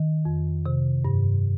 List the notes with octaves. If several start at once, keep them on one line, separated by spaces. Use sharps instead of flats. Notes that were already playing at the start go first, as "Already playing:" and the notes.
Already playing: D#3
F2
C3
G2